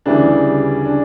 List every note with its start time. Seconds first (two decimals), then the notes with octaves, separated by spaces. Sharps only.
0.06 D2 C#3 E3 G3 D4
0.85 D4